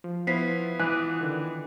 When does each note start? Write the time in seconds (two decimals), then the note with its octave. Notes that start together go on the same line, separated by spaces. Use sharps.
0.04 F3
0.27 B3 E4 F4 C5 B6 C7
0.79 E3 B4 D6 D#6 F#6
1.21 D3 D#3